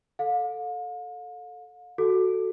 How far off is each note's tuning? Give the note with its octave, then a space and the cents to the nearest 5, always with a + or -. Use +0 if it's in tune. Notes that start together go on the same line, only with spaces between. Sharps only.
A4 +0 F5 +40
F#4 +5 A4 +0